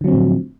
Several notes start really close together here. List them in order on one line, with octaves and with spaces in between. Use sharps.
D3 F#3 C4 F3 A2